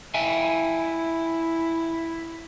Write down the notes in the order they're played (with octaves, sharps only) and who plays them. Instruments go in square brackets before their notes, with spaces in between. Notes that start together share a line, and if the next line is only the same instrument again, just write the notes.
[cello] E4 [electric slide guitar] E5 G5 G#5